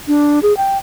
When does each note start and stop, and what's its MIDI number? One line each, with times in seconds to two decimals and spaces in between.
0.08 0.40 62
0.43 0.56 68
0.57 0.78 79